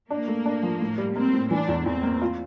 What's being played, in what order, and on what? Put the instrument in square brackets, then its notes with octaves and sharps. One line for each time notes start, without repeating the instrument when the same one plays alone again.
[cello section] A#3 [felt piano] D4
[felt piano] A3
D4
F3
A2
G3
[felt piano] A#3 [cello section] C4
[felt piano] A2
[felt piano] E3 [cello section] D4
[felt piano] E2
[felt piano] E2 [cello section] C4
[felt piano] A#3
F4